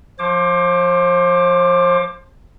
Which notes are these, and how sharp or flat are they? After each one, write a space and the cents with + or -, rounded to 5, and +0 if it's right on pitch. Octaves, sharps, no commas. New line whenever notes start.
F3 +0 C5 +35 D6 +15